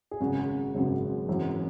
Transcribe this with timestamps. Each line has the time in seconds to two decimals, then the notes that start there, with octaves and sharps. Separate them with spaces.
0.11 G#4
0.20 G#1 F#2 C#3 F#3 F#4
0.74 G#1 F#2 C#3
1.27 G#1 F#2 E3